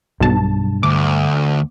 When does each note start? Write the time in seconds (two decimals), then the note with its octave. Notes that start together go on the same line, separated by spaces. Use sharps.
0.20 B1 G2 A5
0.83 D2 D6